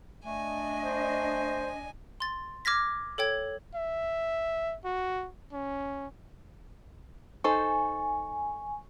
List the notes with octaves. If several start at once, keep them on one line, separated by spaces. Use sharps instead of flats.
A3 D4 D#5 G#5
C5
C6 A6
D6 F6 G#6 A#6 B6
A4 C#5 G5 G#6
E5
F#4
C#4
D#4 A4 C5 G#5 C#6